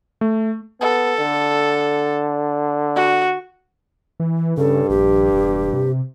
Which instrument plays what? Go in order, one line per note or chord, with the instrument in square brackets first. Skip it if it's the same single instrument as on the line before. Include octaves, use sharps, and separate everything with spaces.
[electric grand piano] A3
[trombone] B3 [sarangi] A4
[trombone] D3
[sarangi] F#4
[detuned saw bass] E3
[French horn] G2 [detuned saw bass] C#3 [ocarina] A4
[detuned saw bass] A#1 [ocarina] G4
[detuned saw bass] E1
C3